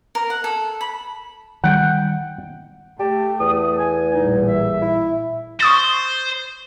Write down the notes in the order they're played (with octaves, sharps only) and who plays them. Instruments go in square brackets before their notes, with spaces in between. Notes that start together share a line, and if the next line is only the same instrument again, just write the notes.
[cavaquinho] A#4
F#5
A4
B5
[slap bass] D#3 G3 [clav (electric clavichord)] F#5 G5
[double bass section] A3 [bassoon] G4 [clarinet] A5
[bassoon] E2 [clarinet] D#6
[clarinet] G#5
[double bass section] A1 A#2 G3 [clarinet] D#4
[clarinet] E5
[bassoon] E4
[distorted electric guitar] C5 [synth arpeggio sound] C#6 D#6 A6